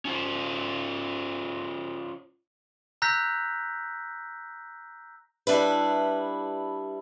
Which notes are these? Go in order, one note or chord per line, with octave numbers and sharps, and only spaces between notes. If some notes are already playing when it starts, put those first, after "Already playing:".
C#4 F4 C5
A#5 E6 F#6 G6 A#6 B6
G3 D4 E4 B4